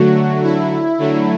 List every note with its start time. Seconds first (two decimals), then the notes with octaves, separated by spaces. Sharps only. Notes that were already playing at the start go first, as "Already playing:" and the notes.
Already playing: D3 F#3 A3 F#4
0.43 E4
0.98 D3 F#3 A3